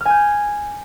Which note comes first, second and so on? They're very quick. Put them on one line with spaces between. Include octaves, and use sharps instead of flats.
F6 G#5 G6